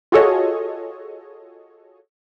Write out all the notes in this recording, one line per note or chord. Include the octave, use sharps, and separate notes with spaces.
F4 F#4 G#4 A4 C#5 D#5